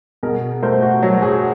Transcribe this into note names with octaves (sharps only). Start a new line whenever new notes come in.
B2 G#4 A#4
A3 A#4 C5
F#4
F#3
F#4 G#4